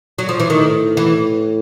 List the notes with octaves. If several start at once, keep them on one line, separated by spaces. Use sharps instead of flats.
F#3
F3
E3
A2 D#3
E3